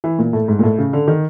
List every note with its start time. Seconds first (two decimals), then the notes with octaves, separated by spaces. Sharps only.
0.04 E3
0.19 A#2
0.33 A2
0.48 G#2
0.59 A#2
0.63 A2
0.78 C#3
0.93 D3
1.08 D#3